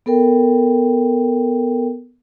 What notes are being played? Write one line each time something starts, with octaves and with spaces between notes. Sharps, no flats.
B3 A4 A#4 G5